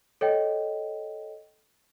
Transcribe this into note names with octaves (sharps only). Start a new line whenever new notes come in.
A4 C#5 D#5 G5